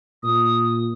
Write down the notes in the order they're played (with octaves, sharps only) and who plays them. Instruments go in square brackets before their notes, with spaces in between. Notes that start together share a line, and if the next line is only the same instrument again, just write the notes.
[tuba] A#2 [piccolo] D#6